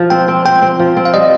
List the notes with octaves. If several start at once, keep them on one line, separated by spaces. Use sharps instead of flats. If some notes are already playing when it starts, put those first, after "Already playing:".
Already playing: F3
C4 G5
C4
C4 G5
C4
F3
C4
F5
G3 D#5